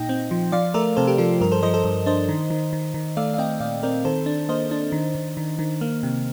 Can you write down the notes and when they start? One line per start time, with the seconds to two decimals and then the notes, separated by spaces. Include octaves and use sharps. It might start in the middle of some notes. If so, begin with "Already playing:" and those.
Already playing: A#2 D#4 D#5 G5
0.09 C4
0.31 F3
0.52 F3 D5 F5
0.74 A3 A#4 D5
0.96 C3 A4 C5
1.07 G4 A#4
1.18 F3 F4 A4
1.41 G2 A#4
1.52 A4 C5
1.63 F3 C5 D#5
1.74 A4 C5
1.84 G2
2.06 D4 C5 D#5
2.29 D#3
2.50 D#3
2.73 D#3
2.94 D#3
3.17 A3 D5 F5
3.34 F5
3.38 C4 D#5 G5
3.60 A#2 D5 F5
3.83 C4 A#4 D5
4.05 D#3 A4 C5
4.26 D4
4.49 A#3 C5 D#5
4.71 D4
4.92 D#3
5.15 D#3
5.37 D#3
5.59 D#3
5.81 A#3
6.03 C3